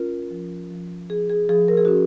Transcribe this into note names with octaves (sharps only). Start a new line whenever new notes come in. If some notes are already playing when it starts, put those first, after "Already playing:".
Already playing: C#4 F4 A#4
F3
F3
F3 G#4
G#4
F3 G#4
A#4
G#4
C#4 F#4